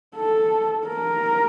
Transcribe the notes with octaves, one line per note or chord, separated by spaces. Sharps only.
A4
A#4